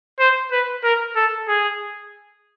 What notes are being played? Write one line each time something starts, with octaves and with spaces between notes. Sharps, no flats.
C5
B4
A#4
A4
G#4